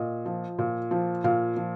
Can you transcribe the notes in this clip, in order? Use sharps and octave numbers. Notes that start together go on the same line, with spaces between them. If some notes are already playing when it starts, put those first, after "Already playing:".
Already playing: A#2 D#5
F3
A#2
F3
A#2 F5
F3